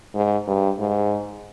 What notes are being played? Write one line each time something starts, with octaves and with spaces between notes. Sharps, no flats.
G#2
G2
G#2